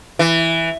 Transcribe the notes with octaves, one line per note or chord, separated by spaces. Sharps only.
E3